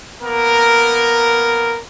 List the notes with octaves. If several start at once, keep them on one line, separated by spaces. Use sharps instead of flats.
A#3 B3 A#4